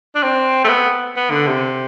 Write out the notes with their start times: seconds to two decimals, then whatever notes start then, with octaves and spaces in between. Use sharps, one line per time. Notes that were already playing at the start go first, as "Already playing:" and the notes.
0.15 D4
0.23 C4
0.64 A3
0.69 B3
1.17 B3
1.31 D3
1.47 C3